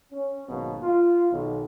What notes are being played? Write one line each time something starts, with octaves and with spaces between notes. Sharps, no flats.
C#4
G#1 B2 F#3 A#3
F4
B1 D#3